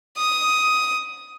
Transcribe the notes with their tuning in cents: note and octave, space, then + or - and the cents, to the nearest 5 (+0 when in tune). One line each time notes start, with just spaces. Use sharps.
D#6 +10